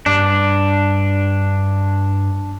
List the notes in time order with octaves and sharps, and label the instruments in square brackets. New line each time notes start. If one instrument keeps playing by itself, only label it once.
[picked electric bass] G2 [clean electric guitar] D4